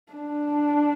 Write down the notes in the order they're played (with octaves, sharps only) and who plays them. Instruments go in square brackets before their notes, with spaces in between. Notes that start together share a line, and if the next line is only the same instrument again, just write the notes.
[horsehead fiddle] D4